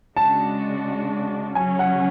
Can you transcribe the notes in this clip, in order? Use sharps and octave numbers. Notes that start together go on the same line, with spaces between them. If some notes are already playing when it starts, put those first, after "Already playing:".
C#3 G#3 D4 F#4 A5
C#3 F#3 C#4 G#5
F#5